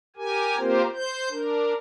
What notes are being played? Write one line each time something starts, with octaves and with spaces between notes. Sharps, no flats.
G4 A#4 G#5
A#3 C4 F4 G4 A#4 C5
C5 G6
D4 A#4